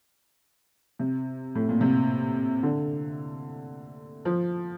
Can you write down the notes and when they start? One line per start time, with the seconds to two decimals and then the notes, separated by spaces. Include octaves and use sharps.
0.99 C3
1.55 A2
1.69 A#2
1.81 C3
2.63 D3
4.25 F3